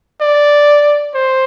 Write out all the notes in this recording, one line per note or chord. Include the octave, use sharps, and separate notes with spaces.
D5
C5